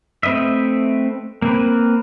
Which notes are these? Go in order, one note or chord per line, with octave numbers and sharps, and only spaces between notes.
A3 C4 B4 D#5 E5
A#3 C4 B4